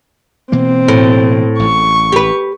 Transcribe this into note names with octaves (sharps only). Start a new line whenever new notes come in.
B2 E3 A#3 C4
A2
A1 C#6
G4 B4